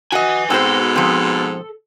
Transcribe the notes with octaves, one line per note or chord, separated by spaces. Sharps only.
F#4 B4 D#5 G#5
G#2 B2 C4 F#4 A4 C5
F3 C4